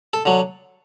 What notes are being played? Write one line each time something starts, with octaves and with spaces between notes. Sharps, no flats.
A4
D3 F#3